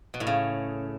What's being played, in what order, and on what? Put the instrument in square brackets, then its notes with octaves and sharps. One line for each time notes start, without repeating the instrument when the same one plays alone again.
[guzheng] B2
A2
C#3